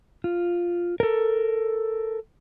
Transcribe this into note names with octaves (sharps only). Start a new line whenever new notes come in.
F4
A4 A#4